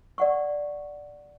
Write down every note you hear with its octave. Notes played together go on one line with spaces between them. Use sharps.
D5 F#5 C#6